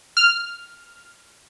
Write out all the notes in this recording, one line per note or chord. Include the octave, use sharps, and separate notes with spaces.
F6